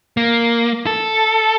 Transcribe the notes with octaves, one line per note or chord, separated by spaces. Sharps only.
A#3
A4